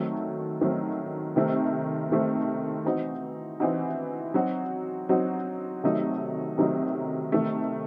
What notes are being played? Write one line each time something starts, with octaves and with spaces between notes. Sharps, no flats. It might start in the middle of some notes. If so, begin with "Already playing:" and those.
Already playing: D#3 F#3 A3 C4
D#3 F#3 A3 C4
C3 D#3 A3 C4
C3 D#3 A3 C4
E3 C4 D#4 F#4
E3 C4 D#4 F#4
F#3 C4 D#4 F#4
F#3 C4 D#4 F#4
C3 D#3 F#3 A3 D#4
C3 D#3 F#3 A3 D#4
C3 D#3 A3